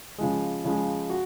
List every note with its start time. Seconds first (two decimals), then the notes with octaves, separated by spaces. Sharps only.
0.18 C#3 F3 G#3
0.64 C#3 F3 G#3
1.10 F#4